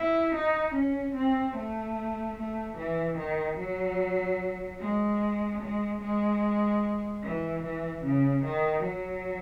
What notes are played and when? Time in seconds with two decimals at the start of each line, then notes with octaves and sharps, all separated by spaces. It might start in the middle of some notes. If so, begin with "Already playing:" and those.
Already playing: E4
0.35 D#4
0.75 C#4
1.15 C4
1.56 A3
2.37 A3
2.78 E3
3.18 D#3
3.59 F#3
4.80 G#3
5.61 G#3
6.02 G#3
7.23 E3
7.64 E3
8.04 C#3
8.44 D#3
8.84 F#3